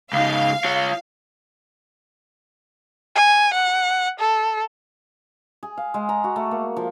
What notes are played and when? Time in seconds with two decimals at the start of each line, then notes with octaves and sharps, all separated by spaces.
0.13 C#2 D#4 F5
0.64 F4 C#5
3.15 G#5
3.54 F#5
4.19 A4
5.63 G#4
5.77 F5
5.94 G#3
6.09 A#5
6.24 F#4
6.36 A3
6.51 A#3
6.76 F3